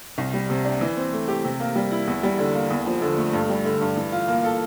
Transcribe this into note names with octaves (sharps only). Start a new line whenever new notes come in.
C2
G3
C3
D4
E3
C4
A3
G4
C3
A#3
G3
E4
E2
G3
D3
A#3
E2
F3
D3
A3
G2
G3
D3
G2
E3
F4
A#3
A4